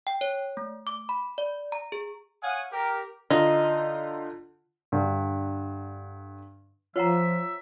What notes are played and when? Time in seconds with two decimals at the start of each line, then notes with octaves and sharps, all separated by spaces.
0.07 G5
0.21 C#5
0.57 A3
0.87 D6
1.09 B5
1.38 D5
1.72 A#5
1.92 G#4
2.43 C#5 F5 F#5 G#5 D#6
2.72 G4 A#4
3.30 D3 D#4 F4
4.92 G2 D3
6.96 F3 F4 C#5 E5 F#5 A#5